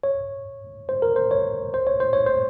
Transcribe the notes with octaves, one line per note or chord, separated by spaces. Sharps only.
C#5
C5
A#4
C5
C#5
C5
C#5
C5
C#5
C5